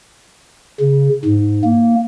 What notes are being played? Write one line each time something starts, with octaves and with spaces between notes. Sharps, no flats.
C#3
G#2
A#3